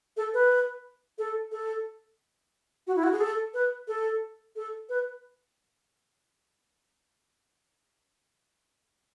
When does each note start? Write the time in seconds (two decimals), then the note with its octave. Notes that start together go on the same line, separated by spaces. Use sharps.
0.17 A4
0.34 B4
1.18 A4
1.52 A4
2.87 F#4
2.96 E4
3.04 F#4
3.12 G#4
3.21 A4
3.54 B4
3.88 A4
4.56 A4
4.89 B4